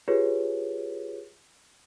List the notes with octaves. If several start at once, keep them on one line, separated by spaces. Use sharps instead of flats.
F4 G4 G#4 B4 C#5